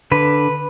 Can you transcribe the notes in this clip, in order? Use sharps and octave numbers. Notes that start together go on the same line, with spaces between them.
D3 B4